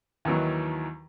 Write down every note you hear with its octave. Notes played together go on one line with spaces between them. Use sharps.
D#2 D#3 E3 F#3